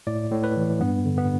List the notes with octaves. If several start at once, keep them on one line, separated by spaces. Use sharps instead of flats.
A2 D5
A2
B4
E3
G2 B3
D3
B3